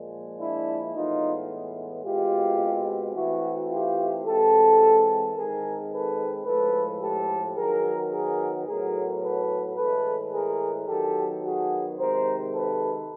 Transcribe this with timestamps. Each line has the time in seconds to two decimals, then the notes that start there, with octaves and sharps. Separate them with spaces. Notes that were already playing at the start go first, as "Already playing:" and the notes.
Already playing: A#2 F3 G#3
0.38 D4 E4
0.93 A2 E3 G#3 B3 D#4 F4
2.04 B2 G#3 C4 F4 G4
3.15 E3 A3 C4 E4 F#4
3.70 F4 G4
4.25 E3 G#3 C4 G4 A4
5.36 D#3 G#3 C4 G#4 A#4
5.91 A4 B4
6.45 A2 F3 G#3 A4 B4
7.01 G4 A4
7.57 D#3 F#3 B3 G#4 A#4
8.11 G#4 A#4
8.67 A2 F#3 B3 G#4 A#4
9.22 A4 B4
9.77 A2 E3 G#3 A4 B4
10.32 G#4 A#4
10.88 D#3 F#3 B3 G4 A4
11.43 F#4 G#4
11.98 C3 D#3 G#3 A#4 C5
12.53 A4 B4